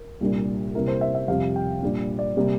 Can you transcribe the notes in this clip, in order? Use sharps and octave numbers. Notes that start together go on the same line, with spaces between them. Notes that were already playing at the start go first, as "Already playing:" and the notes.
Already playing: A#4
C2 A#2 G3 D4
C3 G3 A#3 E4 A#4
C5
E5
E5
F2 C3 G3 F5
G5
A#2 G3 D4
D5
C3 G3 A#3